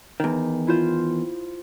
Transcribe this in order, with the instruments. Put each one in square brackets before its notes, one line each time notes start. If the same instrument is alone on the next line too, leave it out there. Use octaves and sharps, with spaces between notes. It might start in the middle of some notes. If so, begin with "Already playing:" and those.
[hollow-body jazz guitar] E2 D#3
[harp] E4 F4 C5